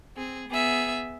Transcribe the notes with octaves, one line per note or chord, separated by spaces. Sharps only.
C4 G#4
B3 G#4 E5